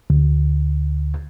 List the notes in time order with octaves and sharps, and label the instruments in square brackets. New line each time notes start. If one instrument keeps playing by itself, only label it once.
[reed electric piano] D2